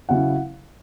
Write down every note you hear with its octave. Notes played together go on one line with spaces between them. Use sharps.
C#3 F#3 C#4 E4 F#5